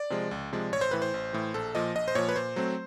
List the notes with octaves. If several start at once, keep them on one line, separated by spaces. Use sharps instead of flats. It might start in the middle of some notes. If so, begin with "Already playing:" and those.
Already playing: D5
C3 F3 G#3
C#2
C3 F3 G#3
A1 C#5
C5
A2 E3 B4
C5
A1
A2 E3
A#1 A4
A#2 F3 D#5
A#1 D#5
C5
A#2 F3 C#5
B4
A#2 C5
F#3 A3 C4